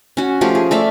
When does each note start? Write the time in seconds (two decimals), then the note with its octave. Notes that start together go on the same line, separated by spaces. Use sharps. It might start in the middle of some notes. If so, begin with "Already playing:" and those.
0.17 C#4 F#4
0.41 F3 A3 F4 G4
0.55 G#4
0.71 A3 D5 E5 F5